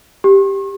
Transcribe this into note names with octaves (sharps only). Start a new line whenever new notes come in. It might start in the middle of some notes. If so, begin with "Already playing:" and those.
G4